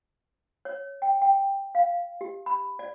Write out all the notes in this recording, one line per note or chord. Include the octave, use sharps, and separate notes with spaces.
C#5
G5
G5
F5
G4
B5
D5